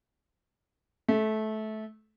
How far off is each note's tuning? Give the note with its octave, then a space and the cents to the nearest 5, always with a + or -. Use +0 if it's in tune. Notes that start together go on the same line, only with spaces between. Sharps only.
A3 -20